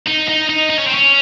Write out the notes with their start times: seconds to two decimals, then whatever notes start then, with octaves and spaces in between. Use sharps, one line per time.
0.06 D#4
0.28 D#4
0.49 D#4
0.70 D#4
0.79 C#4
0.87 C4
0.94 C#4